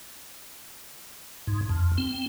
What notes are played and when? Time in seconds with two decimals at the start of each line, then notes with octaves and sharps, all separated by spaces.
1.47 G#2
1.69 F2
1.98 C4